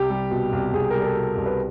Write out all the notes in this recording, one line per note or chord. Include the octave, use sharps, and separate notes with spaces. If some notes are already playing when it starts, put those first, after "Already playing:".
Already playing: C2 G4
G3
B2
C2
C2 G#4
G3 A#4
A4
B2
C2
B4